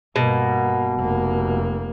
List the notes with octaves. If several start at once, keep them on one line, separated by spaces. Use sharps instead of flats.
G2 B2 A#3
F1 A#3